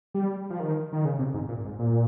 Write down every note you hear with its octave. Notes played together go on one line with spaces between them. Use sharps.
G3
F3
D#3
D#3
C#3
C3
G#2
A#2
G#2
A#2